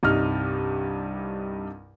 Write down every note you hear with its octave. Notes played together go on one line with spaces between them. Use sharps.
C2 G2 D#4 F6